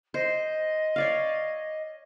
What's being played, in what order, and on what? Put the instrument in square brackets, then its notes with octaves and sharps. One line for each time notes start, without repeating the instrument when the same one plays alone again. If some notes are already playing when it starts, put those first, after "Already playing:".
[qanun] C5 [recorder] D#5
[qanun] C#5 D5 F5